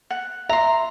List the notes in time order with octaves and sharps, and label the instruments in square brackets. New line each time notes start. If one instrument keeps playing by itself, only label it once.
[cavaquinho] F#5
[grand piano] E5 [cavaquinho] A#5 C6